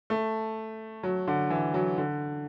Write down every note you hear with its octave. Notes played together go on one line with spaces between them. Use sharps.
A3
F#3
D3
E3
F#3
D3